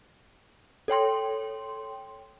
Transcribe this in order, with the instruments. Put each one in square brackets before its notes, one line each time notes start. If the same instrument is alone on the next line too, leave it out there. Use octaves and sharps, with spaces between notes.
[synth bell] A4 C#5 G5 C6